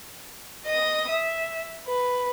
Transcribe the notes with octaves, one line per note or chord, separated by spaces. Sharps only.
D#5 D#6
E5
B4